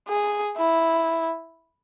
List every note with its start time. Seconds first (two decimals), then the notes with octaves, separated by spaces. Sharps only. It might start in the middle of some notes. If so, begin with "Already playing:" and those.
0.08 G#4
0.57 E4